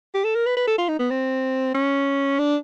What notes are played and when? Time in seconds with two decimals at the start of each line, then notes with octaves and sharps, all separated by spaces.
0.14 G4
0.24 A4
0.35 A#4
0.46 B4
0.57 B4
0.67 A4
0.78 F4
0.89 D#4
0.99 B3
1.11 C4
1.74 C#4
2.39 D4